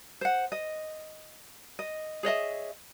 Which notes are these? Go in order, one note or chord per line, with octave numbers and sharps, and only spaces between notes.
C5 F#5
D#5
D#5
G#4 C#5 D#5 E5